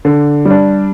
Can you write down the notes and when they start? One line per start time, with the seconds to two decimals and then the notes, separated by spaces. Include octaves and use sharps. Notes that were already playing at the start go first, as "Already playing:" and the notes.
0.05 D3
0.45 G3 D4